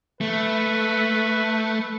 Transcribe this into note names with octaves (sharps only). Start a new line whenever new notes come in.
A3 B4